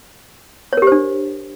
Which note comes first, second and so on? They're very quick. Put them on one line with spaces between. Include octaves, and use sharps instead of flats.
C#5 A#4 G4 C5 D4